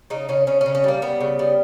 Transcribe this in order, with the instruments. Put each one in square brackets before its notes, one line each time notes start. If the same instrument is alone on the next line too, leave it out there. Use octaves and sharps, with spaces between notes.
[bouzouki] C#3 D#4
C#3 C#4
C#3 C#4
C#4
C#3
C#4
G3 A#3
G3 B3
C#3
G3